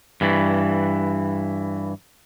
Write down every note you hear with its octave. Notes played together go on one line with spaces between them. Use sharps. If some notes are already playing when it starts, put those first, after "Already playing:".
G2 E3